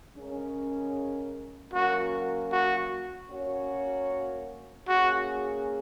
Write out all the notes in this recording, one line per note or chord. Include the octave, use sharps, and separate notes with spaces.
C#3 G#3 C#4 A#4
F#3 A#3 C#4 F#4 A#4
F#4
A#3 C#4 F#4 C#5
A#3 C#4 F#4 G#4